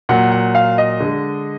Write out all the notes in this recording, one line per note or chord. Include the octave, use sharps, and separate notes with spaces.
A#2 F#3 F#5
F#5
F5
D#5
D3 G#3